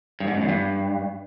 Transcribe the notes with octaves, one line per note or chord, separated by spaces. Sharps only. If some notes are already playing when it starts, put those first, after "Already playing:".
G2
G#2
F#2
E2
G2